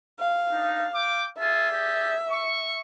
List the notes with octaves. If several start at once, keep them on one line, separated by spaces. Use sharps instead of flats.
F5
D4 D#4
G5 D6
F4 G#4 E5 A5
G4 G#4 D5
C#6